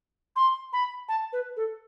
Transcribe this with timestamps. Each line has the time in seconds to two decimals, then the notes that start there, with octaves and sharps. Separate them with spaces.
0.36 C6
0.73 B5
1.09 A5
1.33 B4
1.57 A4